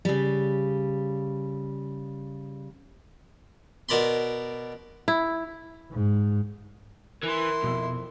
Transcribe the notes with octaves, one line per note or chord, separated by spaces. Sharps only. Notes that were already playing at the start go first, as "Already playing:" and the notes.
C#3 G3
B2 A#4 D5 B5 C6
E4
G#2
E3 E4 A#4 C6
B1 F2 B2 E5